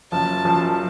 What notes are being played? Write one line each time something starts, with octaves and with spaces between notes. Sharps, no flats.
F#1 F#2 C#3 F3 A5
F#1 F#2 C#3 F3